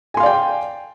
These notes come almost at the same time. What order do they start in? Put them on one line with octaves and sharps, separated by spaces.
G#5 C6 F5 D5 G5